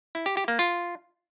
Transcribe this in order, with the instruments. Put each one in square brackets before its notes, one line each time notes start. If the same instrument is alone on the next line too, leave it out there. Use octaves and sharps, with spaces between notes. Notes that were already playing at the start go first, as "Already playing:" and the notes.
[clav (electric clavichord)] E4
G4
G4
A#3
F4